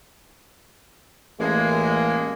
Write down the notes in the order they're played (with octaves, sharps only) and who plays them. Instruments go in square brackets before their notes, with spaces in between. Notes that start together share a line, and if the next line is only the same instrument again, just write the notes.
[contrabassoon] A1 [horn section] G#3 A#3